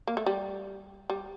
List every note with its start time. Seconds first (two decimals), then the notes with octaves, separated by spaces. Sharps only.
0.07 A#3
0.17 A3
0.26 G3
1.10 G3